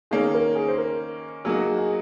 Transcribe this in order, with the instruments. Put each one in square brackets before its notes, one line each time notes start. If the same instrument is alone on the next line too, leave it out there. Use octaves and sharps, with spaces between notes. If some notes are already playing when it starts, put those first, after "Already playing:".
[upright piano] D#3 A#3 C#4 [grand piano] G#4
[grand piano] A#4
G#4
C5
A#4
[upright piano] F#3 A#3 D#4 F#4 [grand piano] G#4
[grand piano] G#4
G#4